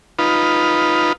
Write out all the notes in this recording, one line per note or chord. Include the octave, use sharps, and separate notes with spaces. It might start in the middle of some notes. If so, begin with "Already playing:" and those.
D#4 F4 B4